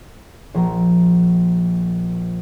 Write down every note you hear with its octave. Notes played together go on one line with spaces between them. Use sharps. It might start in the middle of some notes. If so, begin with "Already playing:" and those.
A#1 F3 A#5